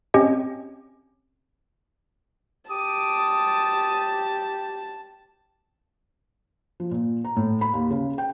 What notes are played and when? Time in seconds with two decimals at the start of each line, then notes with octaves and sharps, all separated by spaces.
0.14 C4 C#4 G4 D#5
2.71 G4 A5 D6 D#6
6.80 F3
6.91 A#2
7.25 A#5
7.37 A2
7.61 B5
7.73 D#2
7.91 C#3
8.18 G5